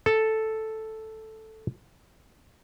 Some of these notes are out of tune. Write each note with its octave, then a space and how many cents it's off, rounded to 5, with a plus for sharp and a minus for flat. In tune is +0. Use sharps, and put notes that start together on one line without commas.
A4 +0